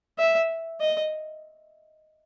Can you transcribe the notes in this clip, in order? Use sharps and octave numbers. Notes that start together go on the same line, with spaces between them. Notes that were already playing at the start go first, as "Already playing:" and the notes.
E5
D#5